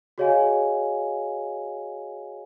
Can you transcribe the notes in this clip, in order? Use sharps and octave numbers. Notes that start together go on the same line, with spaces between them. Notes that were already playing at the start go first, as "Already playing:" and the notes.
F#4 G#4 C#5 D#5 F5 G#5